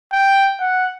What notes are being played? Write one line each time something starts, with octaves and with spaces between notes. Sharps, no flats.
G5
F#5